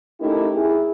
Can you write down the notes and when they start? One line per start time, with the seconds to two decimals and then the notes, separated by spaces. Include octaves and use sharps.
0.21 A3 C#4 D#4 E4 G4 A#4
0.55 E4 G#4